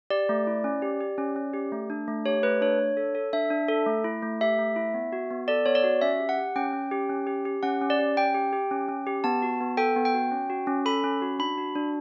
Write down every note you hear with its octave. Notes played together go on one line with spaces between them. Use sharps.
G4 D5
A3
E4
C#4
G4
G4
C#4
C#4
G4
A3
D4
A3
G4 C#5
A3 B4
D4 C#5
D4
A4
A4
D4 E5
D4
A4
A3
E4
A3
G4 E5
A3
E4
B3
F#4
B3
A4 D5
B3 C#5
D5
F#4
C#4 E5
G4
F#5
G4
C#4 G5
C#4
G4
C#4
G4
G4
C#4 F#5
C#4
D5
G4
C#4 G5
G4
G4
C#4
C#4
G4
B3 A5
F#4
B3
A4 G5
B3
G5
F#4
C#4
F#4
C#4
A4 B5
C#4
F#4
D4 B5
F#4
D4